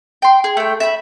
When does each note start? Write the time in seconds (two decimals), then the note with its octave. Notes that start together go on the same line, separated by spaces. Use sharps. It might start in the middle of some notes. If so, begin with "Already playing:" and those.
0.22 G5 C6
0.44 G#4
0.57 A3 G5
0.80 E5 B5